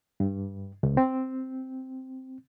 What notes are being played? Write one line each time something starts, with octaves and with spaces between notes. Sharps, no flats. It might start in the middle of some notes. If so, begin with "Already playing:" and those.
G2
C#2
C4